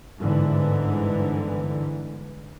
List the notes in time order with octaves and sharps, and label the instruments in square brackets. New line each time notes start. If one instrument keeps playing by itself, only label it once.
[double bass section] G1 G#2 D3 E3